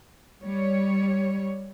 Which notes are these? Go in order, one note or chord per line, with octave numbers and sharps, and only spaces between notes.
G3 C#5